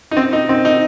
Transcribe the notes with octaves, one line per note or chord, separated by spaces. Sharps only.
D#4
C4
D#4
C4
D#4